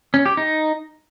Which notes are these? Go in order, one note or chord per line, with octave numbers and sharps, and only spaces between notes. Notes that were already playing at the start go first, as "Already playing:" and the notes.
C#4
G4
D#4